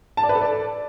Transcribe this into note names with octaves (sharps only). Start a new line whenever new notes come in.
A5
D5
B4
A4
D5